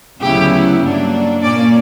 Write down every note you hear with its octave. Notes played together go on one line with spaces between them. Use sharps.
D2 C#3 F#3 B3 E4 G4
G2 F#3 A#3 D4
A#2 A#3 C#4 D5